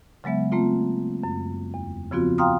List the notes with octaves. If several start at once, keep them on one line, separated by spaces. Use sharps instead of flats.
C#3 F#3 G#3 B3 E5
A3 A#3 C4 F4
F#2
E2
C#3 F3 B3 C4 F4 F#4
F5 G5 A#5 C6 D#6 F6